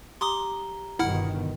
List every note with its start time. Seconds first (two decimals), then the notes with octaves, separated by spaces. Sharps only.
0.21 G4 A#5 C6 D6 D#6 G7
0.99 G1 B2 D#3 E4 F#5 F6